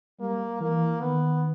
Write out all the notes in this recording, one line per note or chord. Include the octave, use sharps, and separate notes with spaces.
G3 A#3
E3 A#3
D#3 B3